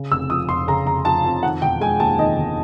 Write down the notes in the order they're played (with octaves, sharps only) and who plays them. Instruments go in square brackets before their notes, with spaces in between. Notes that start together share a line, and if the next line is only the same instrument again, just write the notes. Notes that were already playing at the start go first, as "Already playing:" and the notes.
Already playing: [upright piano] C#3
F1 E6
F3 D#6
F2 C6
C#3 A#5
F1 A#5
F3 A5
F2
D#3 F#5
E1 G5
G#3 G#5
D#2 A5
D#3 D#5
E1